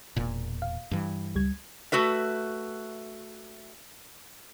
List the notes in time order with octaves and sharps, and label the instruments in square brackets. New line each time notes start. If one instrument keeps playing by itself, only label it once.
[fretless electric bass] E1 A#2
[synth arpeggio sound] F5
[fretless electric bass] G2 E3
[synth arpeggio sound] C#2 G3 G#6
[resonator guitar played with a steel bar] A3 F#4 B4 E5